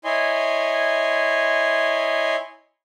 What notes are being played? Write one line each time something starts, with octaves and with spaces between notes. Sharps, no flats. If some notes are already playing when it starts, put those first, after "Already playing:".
E4 C#5 D#5 G#5 C6